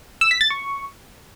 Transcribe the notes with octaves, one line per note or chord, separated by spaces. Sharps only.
E6
B6
A6
C#6